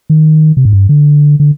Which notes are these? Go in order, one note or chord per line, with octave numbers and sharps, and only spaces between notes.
D#3
C3
G#2
G2
D3
D3